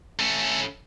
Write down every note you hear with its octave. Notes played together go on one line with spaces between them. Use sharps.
A3 C#4